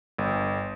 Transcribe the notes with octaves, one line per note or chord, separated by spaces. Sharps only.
G1